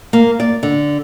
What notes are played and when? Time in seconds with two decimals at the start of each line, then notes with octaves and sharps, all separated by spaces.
0.13 A#3
0.40 D5
0.63 D3